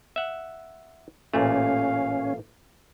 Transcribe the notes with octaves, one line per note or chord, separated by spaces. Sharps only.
E5 F#5
A1 A#2 A3 C#4 F5